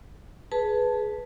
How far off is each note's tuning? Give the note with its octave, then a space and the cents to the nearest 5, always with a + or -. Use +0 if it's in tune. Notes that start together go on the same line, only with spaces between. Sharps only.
G#4 +15 B4 +0 A5 +0